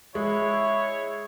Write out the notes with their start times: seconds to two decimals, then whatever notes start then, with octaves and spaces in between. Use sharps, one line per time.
0.15 G#3 E4 C#5